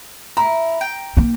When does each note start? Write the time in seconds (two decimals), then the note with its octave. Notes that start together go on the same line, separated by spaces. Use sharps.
0.37 E4 A#5
0.81 G5
1.17 A#3 D#4